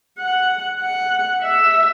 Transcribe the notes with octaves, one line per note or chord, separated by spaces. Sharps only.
F#5
F#5
E5